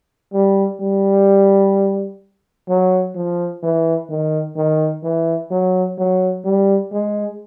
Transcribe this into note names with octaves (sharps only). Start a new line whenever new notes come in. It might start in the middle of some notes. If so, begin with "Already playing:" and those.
G3
G3
F#3
F3
E3
D#3
D#3
E3
F#3
F#3
G3
G#3